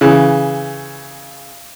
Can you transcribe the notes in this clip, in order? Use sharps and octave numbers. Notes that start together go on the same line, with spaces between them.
C#3 E3